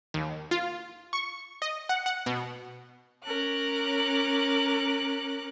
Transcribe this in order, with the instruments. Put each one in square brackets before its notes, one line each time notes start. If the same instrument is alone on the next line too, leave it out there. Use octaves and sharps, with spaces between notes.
[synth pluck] D#2
F4
C#6
D#5
F#5
F#5
B2
[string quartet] C#4 A#4 D6 F#6